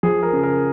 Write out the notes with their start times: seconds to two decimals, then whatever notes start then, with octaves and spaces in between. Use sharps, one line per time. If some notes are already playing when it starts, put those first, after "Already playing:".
0.03 F3 G#4
0.23 A#4
0.33 C#3
0.43 A#4